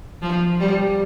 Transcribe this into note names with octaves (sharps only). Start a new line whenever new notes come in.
F3
G3